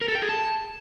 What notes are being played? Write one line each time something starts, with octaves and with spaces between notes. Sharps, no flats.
A#4
A4
G5
G#4
A5